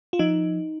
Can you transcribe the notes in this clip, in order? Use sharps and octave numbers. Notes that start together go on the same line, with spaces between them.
F4
F3 D#4